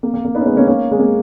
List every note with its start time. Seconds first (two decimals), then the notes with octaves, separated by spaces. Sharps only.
0.03 A#3
0.14 A#3
0.25 A#3
0.35 B3 D#4
0.40 C#4
0.46 G#3 B3
0.56 A#3 C#4
0.67 A#3 C#4
0.91 G#3
0.99 A#3